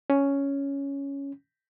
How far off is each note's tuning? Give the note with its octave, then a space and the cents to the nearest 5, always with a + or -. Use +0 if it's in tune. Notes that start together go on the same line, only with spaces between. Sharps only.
C#4 +5